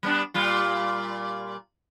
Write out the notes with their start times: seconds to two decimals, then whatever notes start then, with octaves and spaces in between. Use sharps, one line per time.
0.03 G3 B3 D4
0.34 A#2 G3 F4